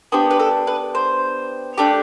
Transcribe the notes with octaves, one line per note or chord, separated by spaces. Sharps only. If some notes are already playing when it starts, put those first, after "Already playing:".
B3 D4 G4 C5
B4
A4
B4
C5
A3 D4 G4